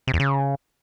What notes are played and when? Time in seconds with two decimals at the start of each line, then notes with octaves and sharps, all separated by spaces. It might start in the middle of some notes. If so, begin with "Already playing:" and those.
0.07 C3
0.14 E2
0.20 C#3